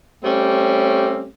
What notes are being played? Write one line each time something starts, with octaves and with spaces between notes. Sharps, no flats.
G3 A3 C4 C#4 G4